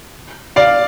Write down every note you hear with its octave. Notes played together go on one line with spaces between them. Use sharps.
D5 F5